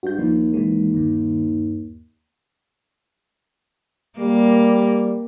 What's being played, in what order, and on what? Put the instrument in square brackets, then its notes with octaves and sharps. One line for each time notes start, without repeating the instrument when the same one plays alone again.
[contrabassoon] G2 [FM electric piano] F#4 G6
[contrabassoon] D#2 [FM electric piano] F3
[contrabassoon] D#2 [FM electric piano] E3 G#3
[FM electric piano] G2 D#3
[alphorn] G3 [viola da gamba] A#3